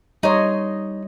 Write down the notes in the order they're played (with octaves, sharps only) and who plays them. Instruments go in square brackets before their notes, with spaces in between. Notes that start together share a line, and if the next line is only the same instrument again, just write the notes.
[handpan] G3 C#5 D#5 [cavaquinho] D#4 C6